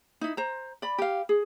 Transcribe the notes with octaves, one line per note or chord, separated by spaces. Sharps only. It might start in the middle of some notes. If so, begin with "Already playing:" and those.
D#4 E4
C5 A#5
D5 B5
G4 F5
G#4